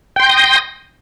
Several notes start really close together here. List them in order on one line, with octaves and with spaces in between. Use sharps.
G5 C6 G6 A#6 D#6